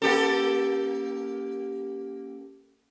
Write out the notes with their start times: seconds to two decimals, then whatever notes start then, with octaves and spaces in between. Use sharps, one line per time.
0.02 A#3 C#4 G4 A4